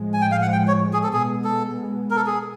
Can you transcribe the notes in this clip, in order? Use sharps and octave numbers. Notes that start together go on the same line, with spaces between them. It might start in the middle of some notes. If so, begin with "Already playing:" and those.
Already playing: A2 F3 G#3
G#5
G5
F5
F#5
G5
C#5
G#4
A4
B2 G#3 B3 G#4
A4
A#4
A4
G#4